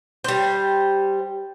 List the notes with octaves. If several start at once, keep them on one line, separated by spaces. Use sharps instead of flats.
G3 C5